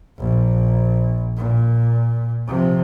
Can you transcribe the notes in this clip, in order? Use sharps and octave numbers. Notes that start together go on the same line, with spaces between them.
A#1
A#2
C3 F3